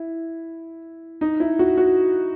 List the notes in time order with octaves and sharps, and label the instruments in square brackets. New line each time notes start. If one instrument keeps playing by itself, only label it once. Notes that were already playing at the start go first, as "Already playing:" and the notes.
Already playing: [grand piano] E4
D#4
E4
F#4
F#4